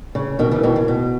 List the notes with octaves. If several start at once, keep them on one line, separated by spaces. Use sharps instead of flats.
C#3
B2 D#3
C#3 E3
B2 D#3
C#3
B2